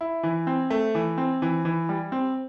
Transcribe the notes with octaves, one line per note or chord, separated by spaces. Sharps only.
E4
E3
C4
A3
E3
C4
E3
E3
G3
C4